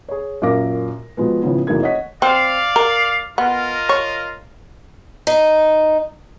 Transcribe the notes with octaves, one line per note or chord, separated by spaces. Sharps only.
G#4 C#5
F#2 A#2 A#4 F5 D6 A#6
B2 F3 G#3 B3
A2 C#3 F3 B3
F1 E3 F#3 A#3 G#4 G#6
C#5 D#5 F#5 B6
C4 D5 F5
A#4
B3 F4 A#4 D#5
C#5
D#4